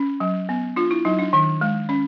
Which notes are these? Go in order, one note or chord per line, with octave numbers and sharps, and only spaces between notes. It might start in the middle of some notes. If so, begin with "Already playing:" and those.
Already playing: C#4
F#3
B3
D4 F4
E4
F#3 D#4
D4
D#3
G#3
C#4